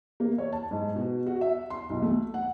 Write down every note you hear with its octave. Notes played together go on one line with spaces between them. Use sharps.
A#3
C#5
A5
G#2
B2
F#4
E5
C6
B1
A3
F#5